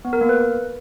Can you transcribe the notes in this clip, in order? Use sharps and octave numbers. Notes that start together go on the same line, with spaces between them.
B3
A#4
A#3
B4